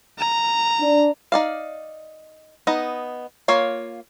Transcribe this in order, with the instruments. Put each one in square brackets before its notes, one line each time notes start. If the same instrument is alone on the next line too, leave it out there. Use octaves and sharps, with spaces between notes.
[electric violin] A#5
[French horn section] D4
[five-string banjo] D#4 D5 F5
B3 D#4 D#5
A#3 F4 C#5 F5